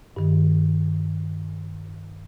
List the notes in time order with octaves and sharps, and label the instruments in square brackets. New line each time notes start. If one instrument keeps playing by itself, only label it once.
[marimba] G2 D#3